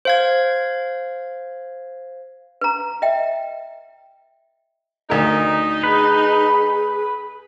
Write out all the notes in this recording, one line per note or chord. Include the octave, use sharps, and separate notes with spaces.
C5 F5 G#6
B4 A#5
D#5 E5 G5
D2 D#4 A#4
G#4 B4